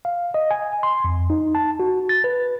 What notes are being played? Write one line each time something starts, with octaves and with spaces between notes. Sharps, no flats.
F5
D#5
G#5
C6
F2
D#4
A5
F#4
A6
B4